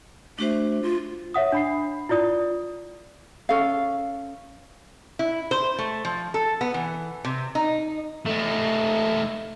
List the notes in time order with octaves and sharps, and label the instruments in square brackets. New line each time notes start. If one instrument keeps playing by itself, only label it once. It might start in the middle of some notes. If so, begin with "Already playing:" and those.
[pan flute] A3 [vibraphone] D4 F#4 C5
[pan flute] F4
[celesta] C#5 E5 F#5 D#6
D4 B5 C7
E4 F4 D5 D#6
[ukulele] C#4 A4 F5
[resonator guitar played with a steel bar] E4
C5
A3
F3
A4
B3
E3
C3
D#4
[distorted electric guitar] A3 D#4